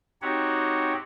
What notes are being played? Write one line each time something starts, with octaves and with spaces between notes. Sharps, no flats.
C4 D#4 F#4 G4 C#5 F#5